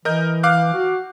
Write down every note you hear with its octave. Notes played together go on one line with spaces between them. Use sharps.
E3 A#4 D#5 G6
F5 D6 F#6
F#4